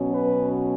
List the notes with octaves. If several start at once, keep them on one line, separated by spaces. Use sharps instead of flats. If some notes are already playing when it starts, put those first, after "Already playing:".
Already playing: B2 F#3 C#4
B4